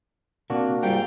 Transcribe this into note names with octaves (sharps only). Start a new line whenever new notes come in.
C3 A#3 D4 F#4
G#2 G3 F4 A#4 G5